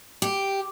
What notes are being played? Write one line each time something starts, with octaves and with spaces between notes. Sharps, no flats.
G4